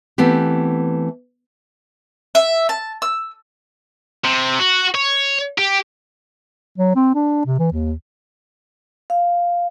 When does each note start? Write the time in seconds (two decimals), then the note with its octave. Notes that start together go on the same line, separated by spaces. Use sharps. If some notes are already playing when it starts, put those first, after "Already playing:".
0.18 E3 A3 B3 C4 G4
2.35 E5
2.69 A5
3.02 E6
4.25 C3
4.59 F#4
4.95 C#5
5.58 G4
6.78 F#3
6.95 C4
7.15 D4
7.46 C3
7.59 E3
7.72 D#2
9.10 F5